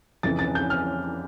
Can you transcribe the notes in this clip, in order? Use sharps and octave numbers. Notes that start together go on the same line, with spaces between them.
F2 C#3 E3 A6
A6
G6
F6